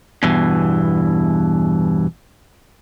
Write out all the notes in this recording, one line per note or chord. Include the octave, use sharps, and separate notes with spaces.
E2 G2 B2 E3